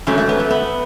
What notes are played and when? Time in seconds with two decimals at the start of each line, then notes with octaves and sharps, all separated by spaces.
0.07 G#2 F#3 A3 C#4
0.18 A3
0.29 B3
0.40 A3
0.51 B3